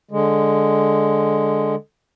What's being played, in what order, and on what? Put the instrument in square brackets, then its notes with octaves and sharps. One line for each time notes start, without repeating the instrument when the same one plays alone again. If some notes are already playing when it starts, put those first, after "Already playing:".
[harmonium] D3 G#3